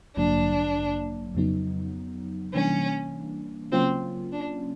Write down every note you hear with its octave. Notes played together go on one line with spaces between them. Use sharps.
A1 G2 D3 F#3 A#3 D4
F2 C#3 F#3 B3 D#4
C3 E3 G3 A#3 C#4 D4
C#3 F#3 A#3 C4 C#4 F4
D4